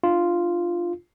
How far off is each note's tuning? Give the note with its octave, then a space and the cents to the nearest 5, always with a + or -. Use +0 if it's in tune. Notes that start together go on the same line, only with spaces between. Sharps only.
D4 +35 F4 -5